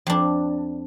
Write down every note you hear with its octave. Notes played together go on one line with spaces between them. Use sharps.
F2 D4